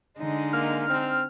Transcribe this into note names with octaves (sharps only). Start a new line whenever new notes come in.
D3 G#3 D#4
A#3 F6
C4